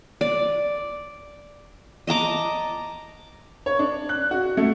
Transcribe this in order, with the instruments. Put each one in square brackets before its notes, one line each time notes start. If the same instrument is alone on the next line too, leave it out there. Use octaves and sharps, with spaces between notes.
[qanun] D5
D#5 A5 A#5 D6
[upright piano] C#5
D4
F#6
F#4
A3